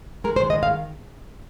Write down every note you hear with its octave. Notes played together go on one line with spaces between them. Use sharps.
G#3 A#4
C5
D#3
D#5
F5